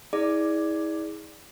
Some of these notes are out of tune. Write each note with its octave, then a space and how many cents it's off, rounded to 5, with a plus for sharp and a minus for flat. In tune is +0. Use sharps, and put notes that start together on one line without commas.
E4 -40 G#4 +0 D5 +0